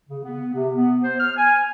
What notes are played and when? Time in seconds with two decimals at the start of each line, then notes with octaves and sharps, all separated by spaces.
0.09 C#3
0.24 B3
0.54 C3
0.75 B3
1.04 C5
1.20 F6
1.36 G#5